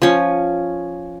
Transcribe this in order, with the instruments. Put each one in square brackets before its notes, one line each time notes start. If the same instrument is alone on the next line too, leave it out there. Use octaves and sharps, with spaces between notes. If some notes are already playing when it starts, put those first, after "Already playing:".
[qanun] F3 C#4